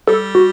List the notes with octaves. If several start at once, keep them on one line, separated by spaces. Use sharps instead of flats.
G3 A4
F#4